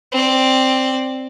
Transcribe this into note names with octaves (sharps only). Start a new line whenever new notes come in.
C4 D5